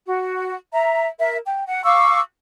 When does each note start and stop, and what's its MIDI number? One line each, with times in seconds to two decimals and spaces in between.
0.07 0.56 66
0.73 1.08 76
0.73 1.08 82
1.19 1.37 70
1.19 1.37 76
1.46 1.64 79
1.67 1.83 78
1.84 2.20 77
1.84 2.20 85
1.84 2.20 86
1.84 2.20 88